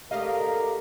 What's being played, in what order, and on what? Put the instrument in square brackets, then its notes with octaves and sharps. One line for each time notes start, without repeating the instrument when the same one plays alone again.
[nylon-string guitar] D3 A3 [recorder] G4 [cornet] A#4 [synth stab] D#5 F5